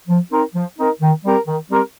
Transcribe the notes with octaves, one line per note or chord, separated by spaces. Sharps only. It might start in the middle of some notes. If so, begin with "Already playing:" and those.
F3
C4 D#4 A#4
F3
C4 D#4 A#4
D#3
G3 C4 G4 A#4
D#3
G3 C4 G4 A#4